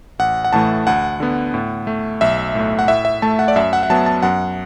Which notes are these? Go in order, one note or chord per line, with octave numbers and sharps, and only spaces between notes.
A1 F#5
F#5
A2 E3 A3 A5
D2 F#5
D3 B3
A2
A3
B1 E5
A2 A3
F#5
A2 E5
E5
A3 A5
F#5
D5
F#2 E5
F#5
F#5
F#3 B3 A5
A5
F#2 F#5